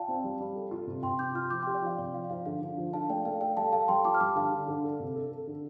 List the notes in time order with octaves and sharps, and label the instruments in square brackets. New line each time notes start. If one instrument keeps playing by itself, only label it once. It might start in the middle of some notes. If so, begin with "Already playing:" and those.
Already playing: [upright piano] F4 [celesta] D5 F5 G5 A5
[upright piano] C4
G3
G3
A4
F4
C3
[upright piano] C3 [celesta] G5 C6
[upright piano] C3 [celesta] D6 G6
[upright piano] F4 [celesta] C6 F6
[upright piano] F3 [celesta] D6 G6
[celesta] G5 C6
[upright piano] G4
[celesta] D5 G5
[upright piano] F3 [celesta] F5
[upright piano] C3 [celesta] D5
[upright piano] F3 [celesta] F5
[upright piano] F3 [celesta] F5
[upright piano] D3 [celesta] F5
[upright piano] D3
F3
[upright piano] D4 [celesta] F5 A5
[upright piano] A3 [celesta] D5 G5
[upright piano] A3 [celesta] F5
[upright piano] A4 [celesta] D5 G5
[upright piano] G3 [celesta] F5 A5
[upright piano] A4 [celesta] F5 A5
[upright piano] G3 [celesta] G5 C6
[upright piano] F4 [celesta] A5 D6
[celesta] F6
[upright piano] G3 [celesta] A5 D6
[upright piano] D3 [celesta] F5 A5
[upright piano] D3
D3
A4
C3
A4
A4
D3